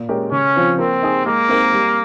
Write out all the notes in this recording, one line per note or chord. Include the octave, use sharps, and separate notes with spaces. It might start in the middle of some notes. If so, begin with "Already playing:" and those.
Already playing: A#2
G#3 C#4 G4 A#4
C#3 C#4
F3 C4 F4 C5
A#3 C4
D#4 G#4
G#3 A#3
C4 D#4 A#4
G3